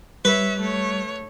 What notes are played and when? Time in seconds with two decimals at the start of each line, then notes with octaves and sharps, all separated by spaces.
0.25 G3 B4 C#5 E5
0.60 A3 C#5